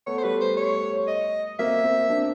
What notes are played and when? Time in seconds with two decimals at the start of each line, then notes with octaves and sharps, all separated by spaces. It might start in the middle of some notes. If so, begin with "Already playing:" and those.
0.07 A3 B3 C#5
0.18 C5
0.23 G3 A3 B4
0.41 C5
0.57 C#5
1.08 D#5
1.59 A#3 C4 E5
1.84 A#3 C4
2.10 C4 D4